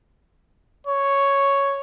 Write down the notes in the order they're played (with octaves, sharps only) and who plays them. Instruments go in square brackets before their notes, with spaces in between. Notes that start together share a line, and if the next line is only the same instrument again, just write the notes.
[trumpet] C#5